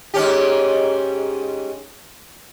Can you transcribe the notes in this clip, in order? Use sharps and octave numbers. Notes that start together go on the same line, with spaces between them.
G#2 C#4 G4